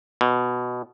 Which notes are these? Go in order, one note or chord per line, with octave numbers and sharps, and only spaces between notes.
B2